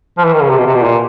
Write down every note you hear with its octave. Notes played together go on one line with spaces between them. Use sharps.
F3
E3
D#3
C#3
C3
B2
C3
B2
A#2